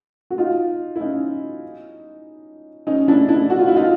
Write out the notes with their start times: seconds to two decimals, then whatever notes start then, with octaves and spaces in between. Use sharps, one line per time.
0.30 F#4
0.38 D#4 F4
0.96 E4
1.01 C#4 D#4
2.87 C#4 D#4
3.08 D4 E4
3.29 D4 E4
3.50 F#4
3.59 F4
3.68 E4
3.76 D#4 F4